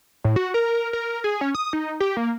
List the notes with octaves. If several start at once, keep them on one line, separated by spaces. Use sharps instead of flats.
A2
F#4
A#4
A#4
G#4
C#4
D#6
D#4
G4
A#3